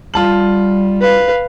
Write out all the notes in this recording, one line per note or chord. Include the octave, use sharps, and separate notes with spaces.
G3 F4 A5 F#7
B4 F5